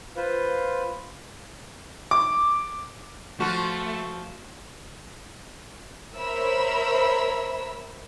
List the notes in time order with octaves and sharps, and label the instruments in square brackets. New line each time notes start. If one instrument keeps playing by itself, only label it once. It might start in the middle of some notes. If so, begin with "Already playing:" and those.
[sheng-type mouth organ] F4 B4 C5
[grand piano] D6
[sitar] F3 F4 F#4 [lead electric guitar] A3
[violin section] A#4 C5 C#5 E5 B5 E6